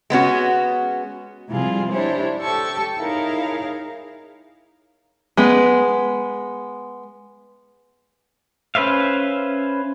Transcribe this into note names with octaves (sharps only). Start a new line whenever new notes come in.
G#3 B3 C#4 F#4
C3 F3 G3 E4 F4 G#4
D4 E4 G4 C5 C#5
G4 A4 G5 A5 C#6 E6
D#4 E4 G#4 A#4 C#5 F5
G#3 B3
C#4 B4 C5 E5 F5